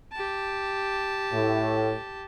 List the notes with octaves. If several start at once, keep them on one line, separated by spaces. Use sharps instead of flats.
G4 A5
A2